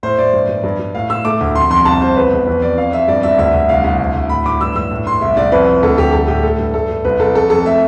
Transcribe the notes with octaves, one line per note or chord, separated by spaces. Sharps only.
A2 C5
A2 D5
G2
G2
G2
G2
A2 F5
A2 E6
A3 D6
D2
F2 C6
F2 C6
C2 A5
C2 C5
E2 B4
E2
F2 B4
F2 D5
F2 F5
F2 E5
G2 D5
G2 E5
D2 E5
D2
C2 F5
C2
D2
D2
A2 B5
A2 D6
G2 E6
G2 E6
A2
A2 C6
C2 E5
C2 D5
F2 B4
F2
D2 A4
D2 G4
G3 A4
A2 G4
A3 A4
G2
A3 A4
G2
C2 B4
C2 A4
F2 A4
F2 A4
A3 E5